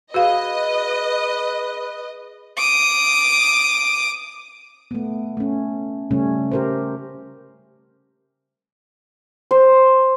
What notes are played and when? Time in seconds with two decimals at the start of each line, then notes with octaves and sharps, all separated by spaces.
0.14 F#4 G#4 B4 D#5 F5
2.57 D6 D#6
4.91 A3 B3
5.37 A3 C#4
6.11 C#3 G3 A3 C#4
6.52 G4 A#4 C5
9.51 C5